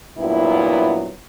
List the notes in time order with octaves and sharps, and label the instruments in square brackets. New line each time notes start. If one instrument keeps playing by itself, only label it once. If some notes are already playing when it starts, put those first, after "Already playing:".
[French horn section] G2 A#2 F#3 B3 E4